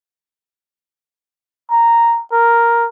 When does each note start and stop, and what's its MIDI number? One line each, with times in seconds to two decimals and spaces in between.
1.71 2.21 82
2.32 2.87 70